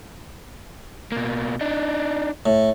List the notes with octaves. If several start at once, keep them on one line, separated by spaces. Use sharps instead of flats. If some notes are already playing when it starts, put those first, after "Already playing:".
B2 A#3
D4 D#4
A2